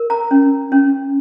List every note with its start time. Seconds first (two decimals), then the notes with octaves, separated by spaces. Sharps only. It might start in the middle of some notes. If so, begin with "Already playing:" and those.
Already playing: A#4
0.10 A#5
0.31 C#4
0.72 C#4